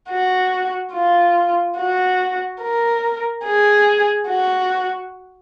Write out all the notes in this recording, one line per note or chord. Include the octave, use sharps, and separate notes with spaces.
F#4
F4
F#4
A#4
G#4
F#4